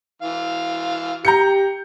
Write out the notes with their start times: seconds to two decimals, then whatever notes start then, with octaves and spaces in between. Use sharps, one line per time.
0.22 E3 F5
1.25 G4 A#5 G6 C#7